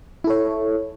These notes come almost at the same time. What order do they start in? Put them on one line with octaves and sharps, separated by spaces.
E4 A4 C#5